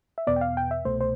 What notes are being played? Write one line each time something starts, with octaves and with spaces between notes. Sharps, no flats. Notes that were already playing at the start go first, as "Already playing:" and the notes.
E5
E2 B2 B3 D5
G5
F5
G5
E5
C2 B2 A3 C5
C5